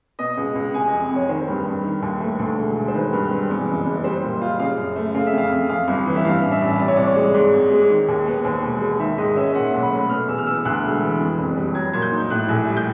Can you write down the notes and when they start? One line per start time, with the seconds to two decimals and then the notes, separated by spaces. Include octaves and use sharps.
0.19 B2 D#5
0.37 C#2
0.55 C#2
0.74 C3 G#5
0.87 D#5
0.92 F2
1.11 F2 C#5
1.29 D#3 C5
1.48 G2
1.66 G2
1.84 D#3
2.02 D#2
2.21 A3
2.39 D2
2.58 E1
2.76 E1
2.88 C5
2.94 D#3 B4
3.13 G2
3.31 C4
3.50 E2
3.68 F#1
3.86 F#1
4.04 G3 C5
4.23 A#2
4.41 F4
4.59 C#3 F5
4.77 F#2
4.96 A3
5.15 C#3 F5
5.27 E5
5.32 F2
5.38 F5
5.51 F2
5.69 F2 F5
5.88 G1
6.06 E3
6.16 E5
6.25 G2 F5
6.43 A1
6.52 E5
6.61 A1
6.79 C3 D5
6.88 C#5
6.96 C2 D5
7.07 C#5
7.16 G#3
7.34 G#2
7.54 G#1
7.72 G#3
7.90 D#3
8.08 D#2
8.27 B3
8.44 D#2 C5
8.63 E1
8.81 G#3
9.00 D#3 E5
9.18 G#2 D#5
9.36 C#4 E5
9.55 A#2 F#5
9.73 B1
9.83 B5
9.92 A3
10.09 B2 F6
10.28 E2 E6
10.38 F6
10.46 B3 E6
10.65 D2 F#6
10.84 E1
11.02 E3
11.20 F2
11.38 F#1
11.57 G3
11.75 F#3 G#6
11.93 A#2 G#6
12.02 G6
12.12 D#4
12.30 A2 F#6
12.48 A#1
12.67 G3
12.77 G6